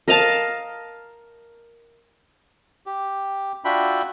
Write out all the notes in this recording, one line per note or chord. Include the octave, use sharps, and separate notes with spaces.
A#4 D#5 F5 A5
G4
D4 F4 F#4 E5 G5 B5